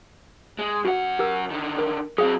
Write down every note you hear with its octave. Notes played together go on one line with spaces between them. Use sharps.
G#3
F#2 F#4 F#5
G4 A#4 E6
D3 D#3
A#4
F#3 C4 G#4 F5